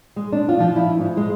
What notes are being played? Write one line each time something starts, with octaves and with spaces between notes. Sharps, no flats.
G#3
D4
F4
F3
E4
G#2
G#3